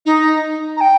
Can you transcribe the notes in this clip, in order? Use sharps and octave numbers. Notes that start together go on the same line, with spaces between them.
D#4
A#5
G5